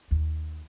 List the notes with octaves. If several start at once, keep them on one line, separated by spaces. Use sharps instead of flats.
D#2